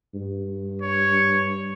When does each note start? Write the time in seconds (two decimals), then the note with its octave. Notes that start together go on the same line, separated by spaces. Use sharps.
0.15 G2
0.82 C#5